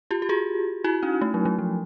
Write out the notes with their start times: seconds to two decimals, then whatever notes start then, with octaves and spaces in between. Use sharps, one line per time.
0.11 F4 G4
0.22 G4
0.29 F#4 G#4
0.84 E4 F#4
1.03 C#4 D#4
1.21 A3
1.34 F#3
1.45 F#3
1.59 F3